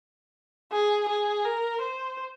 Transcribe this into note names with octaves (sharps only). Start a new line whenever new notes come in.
G#4
G#4
A#4
C5